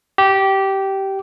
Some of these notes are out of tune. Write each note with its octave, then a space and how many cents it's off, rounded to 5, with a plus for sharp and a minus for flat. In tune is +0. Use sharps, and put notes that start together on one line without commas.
G4 -15